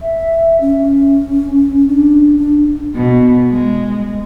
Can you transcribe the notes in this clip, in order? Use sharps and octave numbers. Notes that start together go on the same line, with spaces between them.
E5
C#4
D4
D4
B2
G#3